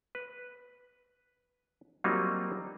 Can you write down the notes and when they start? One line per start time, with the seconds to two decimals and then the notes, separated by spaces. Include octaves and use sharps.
0.15 B4
2.04 F#3 G3 A#3 C4 D#4 F4